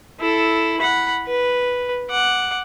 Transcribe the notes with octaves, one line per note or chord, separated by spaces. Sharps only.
E4 A4
F#5 B5
B4
F#5 D6